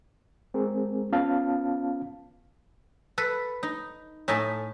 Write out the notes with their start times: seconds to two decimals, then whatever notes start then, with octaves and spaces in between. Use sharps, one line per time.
0.54 G#3 C4 G#4 A#4
1.12 B3 C#4 F4 F5 A5
3.18 A4 B4
3.63 D#4
4.28 A2 D#4 E5 G#5 A5